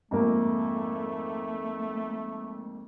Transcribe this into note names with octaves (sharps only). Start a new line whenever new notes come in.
F2 G#2 A3 A#3